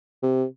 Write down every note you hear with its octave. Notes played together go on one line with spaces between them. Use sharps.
C3